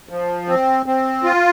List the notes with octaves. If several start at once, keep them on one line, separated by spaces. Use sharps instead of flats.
F3
C4
C4
F4